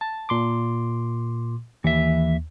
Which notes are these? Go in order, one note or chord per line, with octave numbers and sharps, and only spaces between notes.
A5
A#2 C6 D6
D#2 E3 E5